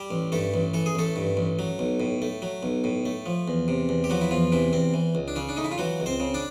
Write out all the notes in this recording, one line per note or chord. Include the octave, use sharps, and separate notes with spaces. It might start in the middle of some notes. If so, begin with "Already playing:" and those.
Already playing: G3 G4
A1
G2 A3 A4
A1
E3 A4
G#4
A1 A3 A4
G2
A1
F#3
B1
A2
A3
F#3
B1
A2
A3
F3
E2
C3
E2
G4
F3 F#3 F#4
E4
E2 F3 F4
C3 E3 E4
E2 C4
E3
C#2
D4
C#3 C#4
D4
A3 D#4
E4
F4
E3 F#3 F#4
C#2
C4 C5
C#3
D4 D5